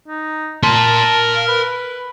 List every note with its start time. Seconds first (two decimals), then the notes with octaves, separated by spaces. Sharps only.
0.08 D#4
0.64 A#4 A5 C6
1.36 F5
1.48 B4